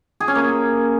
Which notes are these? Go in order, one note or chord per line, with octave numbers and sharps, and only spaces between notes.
G#4
C#4
A#3